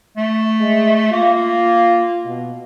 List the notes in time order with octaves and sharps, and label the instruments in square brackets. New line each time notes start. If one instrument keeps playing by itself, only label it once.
[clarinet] A3
[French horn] G#3
[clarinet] A#3 [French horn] F4
[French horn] B2